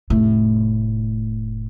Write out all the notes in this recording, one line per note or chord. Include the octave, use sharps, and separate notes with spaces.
F1 A2